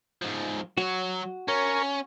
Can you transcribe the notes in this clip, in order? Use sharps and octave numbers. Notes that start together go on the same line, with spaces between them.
G#2 F3
F#3 F#4 C#5
C#4 A#4 C#5